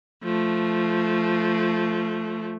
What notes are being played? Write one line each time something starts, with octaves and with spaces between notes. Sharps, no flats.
F3 A3